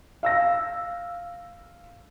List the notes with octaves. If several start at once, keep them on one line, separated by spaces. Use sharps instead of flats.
F5 E6 A#6